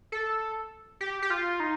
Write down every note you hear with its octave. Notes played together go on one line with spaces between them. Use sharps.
A4
G4
G4
F4
D#4